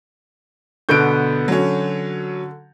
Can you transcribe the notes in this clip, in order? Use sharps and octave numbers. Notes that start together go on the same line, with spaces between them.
B2 D3 B3 G6 D7
D3 F#3 C#4